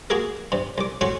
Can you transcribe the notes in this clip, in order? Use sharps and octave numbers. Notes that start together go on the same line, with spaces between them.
A#3 F#4 G#4 A#4
G2 C3
C2 D6
A2 C#4 F#4 C6 C#6